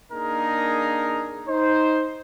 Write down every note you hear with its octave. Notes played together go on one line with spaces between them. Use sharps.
A#3 D4 D#4 G#4 A#4
D#4 C5